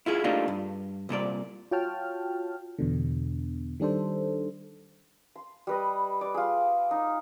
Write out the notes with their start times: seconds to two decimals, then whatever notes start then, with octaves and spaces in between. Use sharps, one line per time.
0.06 E4 F4 G#4
0.24 A3 A#3 D4 D#4 F4 G4
0.48 G2
1.09 C2 A#2 A4 D5
1.71 F4 F#4 C#5 G5 A5 F6
2.79 E2 B2 D3
3.80 D#3 G3 D4 A4 C5
5.36 C6
5.67 G3 B4 D#5
6.21 D5
6.34 F4 G#4
6.91 D#4